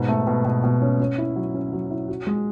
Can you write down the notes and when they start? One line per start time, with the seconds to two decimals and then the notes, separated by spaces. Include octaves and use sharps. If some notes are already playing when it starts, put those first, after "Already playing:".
Already playing: G#2 B2
0.08 A3
0.27 B2
0.45 B2
0.64 B2
0.82 C#4
1.00 C#4
1.18 E4
1.36 F#3
1.54 C#4
1.73 F#3
1.91 E4
2.08 F#4
2.27 G#3